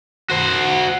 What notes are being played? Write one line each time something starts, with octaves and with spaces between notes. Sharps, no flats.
F#4 C5